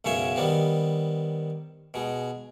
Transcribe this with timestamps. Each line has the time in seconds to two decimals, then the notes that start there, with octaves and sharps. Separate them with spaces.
0.05 B1 F#2 C#3 C#4 C#5 E5
0.36 D#3 G3 B3 C4
1.94 B2 G#3